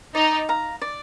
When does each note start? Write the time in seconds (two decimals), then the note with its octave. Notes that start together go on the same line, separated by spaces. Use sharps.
0.15 D#4 D5
0.49 F5 A#5
0.82 D5